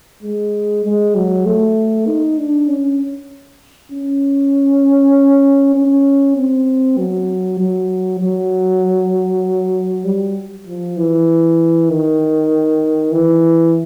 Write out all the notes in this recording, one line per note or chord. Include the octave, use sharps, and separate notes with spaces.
G#3
G#3
F#3
A3
D#4
D4
C#4
C#4
C#4
C4
F#3
F#3
F#3
G3
F3
E3
D#3
E3